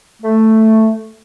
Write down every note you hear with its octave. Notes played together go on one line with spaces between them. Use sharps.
A3